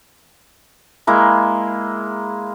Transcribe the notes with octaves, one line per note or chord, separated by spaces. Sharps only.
G#3 A#3 E4